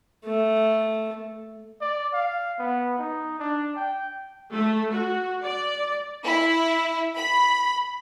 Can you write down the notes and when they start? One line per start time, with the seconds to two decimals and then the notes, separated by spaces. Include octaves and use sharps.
0.25 A3
1.82 D5
2.14 F5
2.59 B3
2.99 D#4
3.39 D4
3.76 G5
4.54 A3
4.92 F#4
5.44 D5
6.24 E4
7.16 B5